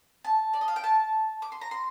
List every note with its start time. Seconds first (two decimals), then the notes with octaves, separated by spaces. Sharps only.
0.24 A5
0.53 D5
0.61 D#5
0.68 F5
0.76 G5
0.84 A5
1.42 D6
1.52 C6
1.61 A#5
1.71 C6